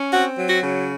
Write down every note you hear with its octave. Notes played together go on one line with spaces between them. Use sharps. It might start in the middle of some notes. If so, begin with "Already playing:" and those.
Already playing: C#4
C4 F#4
F#3
F#4
C#3